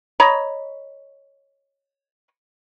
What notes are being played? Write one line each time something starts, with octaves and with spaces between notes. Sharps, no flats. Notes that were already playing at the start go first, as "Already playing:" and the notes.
C#5 D#5 A#5 B5